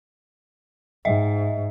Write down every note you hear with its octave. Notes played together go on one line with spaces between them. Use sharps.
G#2 D#5 E5